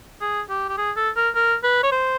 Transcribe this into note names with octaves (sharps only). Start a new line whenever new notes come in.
G#4
G4
G4
G#4
A4
A#4
A#4
B4
C#5
C5